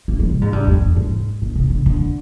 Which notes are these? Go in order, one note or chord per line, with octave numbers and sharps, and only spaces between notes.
A#3
G3
C3
G#2
G2
F2
G2
G#2
A#2
C3
D3
D3